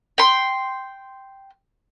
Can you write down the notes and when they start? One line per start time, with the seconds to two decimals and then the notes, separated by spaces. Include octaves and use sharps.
0.18 G5 C6